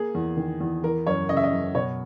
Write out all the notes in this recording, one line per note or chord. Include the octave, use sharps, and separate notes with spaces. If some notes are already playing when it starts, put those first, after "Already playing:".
Already playing: A#3 G#4
E2
D#3
E2
E3 A#4
F#2 C#5
C#3 D#5
E5
D#5
F#2
B2 C#5